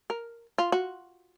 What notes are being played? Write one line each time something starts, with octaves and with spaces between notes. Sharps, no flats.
A#4
F4
F#4